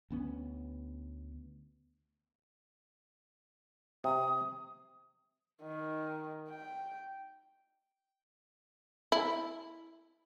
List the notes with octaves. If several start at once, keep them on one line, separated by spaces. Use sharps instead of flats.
D2 B3 C#4
C3 D#6
D#3
G5
E4